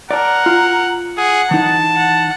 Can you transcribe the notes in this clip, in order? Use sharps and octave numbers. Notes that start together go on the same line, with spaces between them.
A#4 D5 F#5 A5
F4
G#4 F#5
E3 D#4 A5
F#5